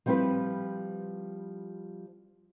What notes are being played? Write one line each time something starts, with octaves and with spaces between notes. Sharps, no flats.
F3 G3 C4 E4 B4